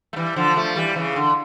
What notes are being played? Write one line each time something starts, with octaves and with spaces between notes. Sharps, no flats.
A3
E3 G3
D3 F3
F3 A3
E3 G3
C#3 E3
D3